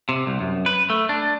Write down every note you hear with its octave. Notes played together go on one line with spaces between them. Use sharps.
C3
C2
F#2
B4
A3
D4